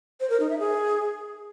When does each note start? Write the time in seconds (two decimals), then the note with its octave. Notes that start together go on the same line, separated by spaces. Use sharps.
0.20 C5
0.30 A#4
0.40 D#4
0.50 E5
0.59 G#4